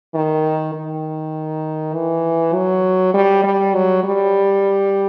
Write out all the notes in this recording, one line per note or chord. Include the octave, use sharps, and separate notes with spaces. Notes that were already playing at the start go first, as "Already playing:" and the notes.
D#3
D#3
E3
F#3
G3
G3
F#3
G3